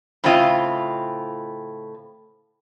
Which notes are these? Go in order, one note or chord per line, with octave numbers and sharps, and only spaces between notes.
A2 C#3 C4 E4 F4 D#5